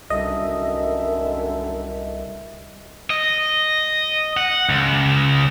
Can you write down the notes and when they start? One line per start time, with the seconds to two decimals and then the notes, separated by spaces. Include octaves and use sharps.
0.10 C2 F#2 D3 D#3 D#5 E5
3.10 D#5
4.37 F#5
4.69 C#2